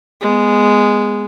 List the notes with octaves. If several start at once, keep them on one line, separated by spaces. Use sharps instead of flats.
G#3 B3